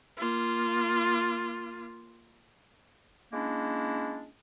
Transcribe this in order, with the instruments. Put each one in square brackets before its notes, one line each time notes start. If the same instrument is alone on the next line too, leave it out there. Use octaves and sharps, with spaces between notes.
[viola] A#3 F4
[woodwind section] G#3 A#3 C#4 D4 E4